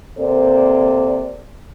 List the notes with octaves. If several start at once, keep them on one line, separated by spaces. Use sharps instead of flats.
C3 A#3 C4 A4 C5 D5